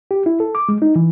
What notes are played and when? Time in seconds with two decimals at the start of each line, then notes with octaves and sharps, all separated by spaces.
0.11 G4
0.26 E4
0.40 A4
0.55 D6
0.69 G#3
0.82 D#4
0.96 E3